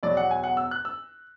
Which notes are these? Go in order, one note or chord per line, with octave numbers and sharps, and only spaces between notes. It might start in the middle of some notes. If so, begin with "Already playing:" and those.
E2 B2 F#3 D5
F#5
G#5
F#5
E6
F#6
E6